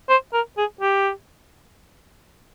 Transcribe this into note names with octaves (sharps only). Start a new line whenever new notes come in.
C5
A#4
G#4
G4